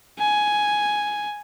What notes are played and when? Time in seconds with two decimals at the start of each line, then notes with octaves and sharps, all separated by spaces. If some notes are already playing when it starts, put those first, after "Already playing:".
0.19 G#5